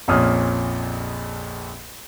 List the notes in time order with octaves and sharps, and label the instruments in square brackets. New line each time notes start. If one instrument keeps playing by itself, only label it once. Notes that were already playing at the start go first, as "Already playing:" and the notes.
[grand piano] A#1 F2 A#2 C#4 D#6 F6